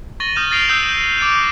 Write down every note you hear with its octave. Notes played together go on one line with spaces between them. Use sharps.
C#6 A6 A#6 D#7 F#7 G7
D#6 F6 G6 E7
F6 A6 A#6 C7 D7 F7
D#6 E6 G6 A6 C7
E7
D6 A6 C#7 D7 E7